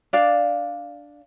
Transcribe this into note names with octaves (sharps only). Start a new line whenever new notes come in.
D4 D5 F5